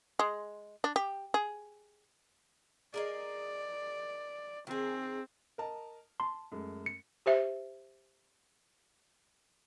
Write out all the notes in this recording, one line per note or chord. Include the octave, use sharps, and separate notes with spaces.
G#3
D4
G4
G#4
G#4 A#4 D5 D#5
D#3 C4 G#4
A#4 D#5 A5
A5 C6
F#2 G#3 A3
C#7
G4 C5 E5